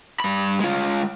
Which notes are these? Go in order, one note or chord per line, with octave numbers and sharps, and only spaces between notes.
G2 B5
G#3 F4